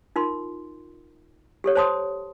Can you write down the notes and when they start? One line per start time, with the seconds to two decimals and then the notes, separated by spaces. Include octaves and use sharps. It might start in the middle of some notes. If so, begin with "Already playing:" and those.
0.16 D#4 F4 A#4 C6
1.64 G4 A4 C#5
1.75 C5 C#5 A5 C6 D#6